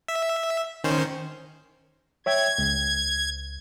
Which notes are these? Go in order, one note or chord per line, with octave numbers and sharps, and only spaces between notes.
E5
D#3 C#4 C5
C#5 E5 G5 G#6
C#2